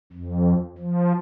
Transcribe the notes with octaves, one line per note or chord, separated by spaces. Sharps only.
F2
F3